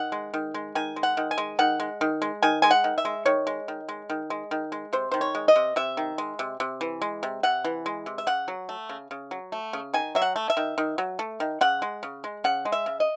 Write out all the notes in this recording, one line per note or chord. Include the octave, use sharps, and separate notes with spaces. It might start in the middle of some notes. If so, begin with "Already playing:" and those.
Already playing: D#3 F#5
G#3
D#3
G#3
D#3 G#5
G#3
F#5
D#3
G#5
G#3
D#3 F#5
G#3
D#3
G#3
D#3 G#5
G#3 G#5
F#5
D#3
E5
G#3
D#3 C#5
G#3
D#3
G#3
D#3
G#3
D#3
G#3
C3 C5
D#3 C5
C#5
G#3
D#5
C3
C3 E5
D#3
G#3
C3
C3
E3
G#3
C3
C3 F#5
E3
G#3
C3
E5
C#3 F#5
F#3
A3
C#3
C#3
F#3
A3
C#3
D#3 G#5
F#3 E5
F#5
A3
E5
D#3
D#3
F#3
A3
D#3
C#3 F#5
G#3
C#3
G#3
C#3 F#5
G#3
E5
C#3
D#5